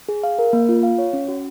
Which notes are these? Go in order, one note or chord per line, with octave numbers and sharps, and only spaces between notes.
G#4
F5
A#4
A#3
F4
F5
C#5
C#4
F#4